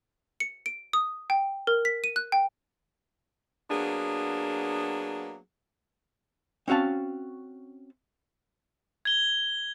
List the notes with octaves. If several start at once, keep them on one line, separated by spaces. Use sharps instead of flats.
C#7
D7
D#6
G5
A#4
B6
D#7
F#6
G5
F#3 A#3 B3 D4 G#4
C4 C#4 F#4 F5 A5
G#6 G7